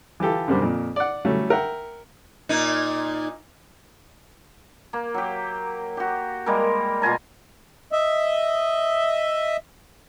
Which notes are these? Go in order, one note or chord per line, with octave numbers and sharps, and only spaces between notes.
E3 F4 G4 A4
F#2 C3 G3 A#3 C4 D4
F2 A#2
D5 F#5
F#3 G3 A3 C#4
A#4 E5 F#5 G5
A#2 D#4
A#3
F#3 G4
F#4 G4
G3 G#3 A#3 A#4
B2 F4 G#5 A#5
D#5 E5